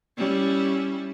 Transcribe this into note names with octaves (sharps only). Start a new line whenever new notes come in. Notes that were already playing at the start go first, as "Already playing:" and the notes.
G3 C#4 E4